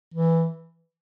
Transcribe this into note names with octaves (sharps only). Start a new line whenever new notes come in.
E3